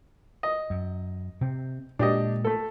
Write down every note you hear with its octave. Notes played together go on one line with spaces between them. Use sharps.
D#5
F#2
C3 C4
A#2 G#3 D4 G4 D#5
A3 A4